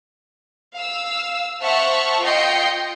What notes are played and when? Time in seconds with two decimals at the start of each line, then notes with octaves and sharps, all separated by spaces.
0.75 F5 E6
1.61 C5 E5 F#5 A5 C#6 F6
2.23 F4 D#5 G5 G6 C7 C#7